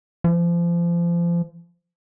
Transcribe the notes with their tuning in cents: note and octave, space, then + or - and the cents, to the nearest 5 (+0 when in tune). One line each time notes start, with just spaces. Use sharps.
F3 -30